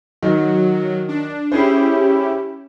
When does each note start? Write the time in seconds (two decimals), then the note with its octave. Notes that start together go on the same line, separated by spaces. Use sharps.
0.23 D#3 F#3
1.08 D4
1.52 C#4 E4 G4 G#4 C5